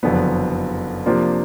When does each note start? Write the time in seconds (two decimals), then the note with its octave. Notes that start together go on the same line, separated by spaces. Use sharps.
0.03 F#1 F2 D3 F#3 B3
1.06 C3 F3 A#3 D4 F4